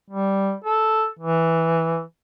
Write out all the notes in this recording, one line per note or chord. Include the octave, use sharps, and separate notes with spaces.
G3
A4
E3